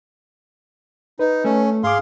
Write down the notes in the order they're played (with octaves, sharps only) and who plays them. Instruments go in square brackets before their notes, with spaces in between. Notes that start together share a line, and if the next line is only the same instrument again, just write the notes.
[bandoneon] D#4 [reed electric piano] B4
[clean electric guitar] A3 [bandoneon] C#4
[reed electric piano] G#2 D6 [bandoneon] G#4 F5 C6